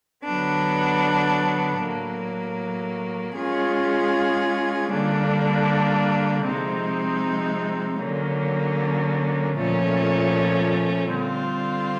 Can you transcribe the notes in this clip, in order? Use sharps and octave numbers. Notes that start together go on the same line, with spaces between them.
D3 F#3 B3 D4
A2 F#3 A#3
G#3 C#4 F4 G#4
D3 G3 A#3 D4
C3 F3 G#3 C4 D#4
D3 F#3 A#3 C#4
A#2 F3 A3 C#4
D3 G3 C4 F4